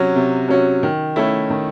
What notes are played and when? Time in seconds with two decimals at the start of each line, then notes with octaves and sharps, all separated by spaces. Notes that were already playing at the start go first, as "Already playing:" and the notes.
Already playing: C3 F#3 C#4 F#4
0.15 C3
0.48 F#3 C#4 F#4
0.83 D#3
1.16 A3 C#4 E4
1.50 D#3